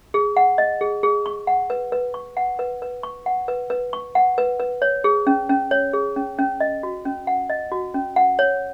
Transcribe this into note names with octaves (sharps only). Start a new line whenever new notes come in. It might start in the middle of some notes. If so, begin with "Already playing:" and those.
G#4
F#5
D#5
G#4
G#4
C#6
F#5
B4
B4
C#6
F#5
B4
B4
C#6
F#5
B4
B4
C#6
F#5
B4
B4
C#5
G#4
C#4
C#4
C#5
G#4
C#4
C#4
D#5
F#4
C#4
F#5
D#5
F#4
C#4
F#5
C#5